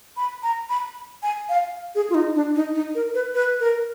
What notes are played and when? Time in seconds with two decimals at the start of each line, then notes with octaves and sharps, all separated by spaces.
0.17 B5
0.43 A#5
0.70 B5
1.23 G#5
1.49 F5
1.95 G#4
2.10 F4
2.15 D#4
2.35 D4
2.55 D#4
2.75 D#4
2.95 A#4
3.14 B4
3.35 B4
3.60 A#4